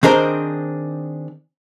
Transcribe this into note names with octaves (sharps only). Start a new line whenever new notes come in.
D#3 C4 D4 G#4 A#4 C5